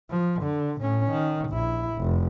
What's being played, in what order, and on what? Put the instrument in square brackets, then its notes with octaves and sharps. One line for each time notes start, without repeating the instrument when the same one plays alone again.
[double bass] F3
D3
A2 C#4
D#3
A#1 E4
F1